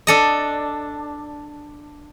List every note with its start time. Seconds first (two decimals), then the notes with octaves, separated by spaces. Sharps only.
0.07 D4 A4 D#5